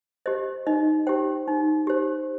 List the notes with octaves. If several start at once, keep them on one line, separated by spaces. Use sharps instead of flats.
G4 C5 D#5
D#4 D#5
G4 C5 G5
D#4
G4 C5